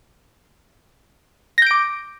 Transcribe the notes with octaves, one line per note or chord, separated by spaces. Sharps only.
D6 G6 A#6 D7